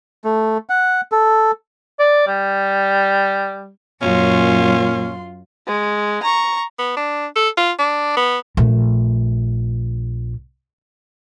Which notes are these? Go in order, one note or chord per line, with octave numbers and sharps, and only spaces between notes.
A3
F#5
A4
D5
G3
F#2 A#2 C#4 F4 C6
G#3
A#5 C#6
B3
D4
A4
F4
D4
B3
A#1 A3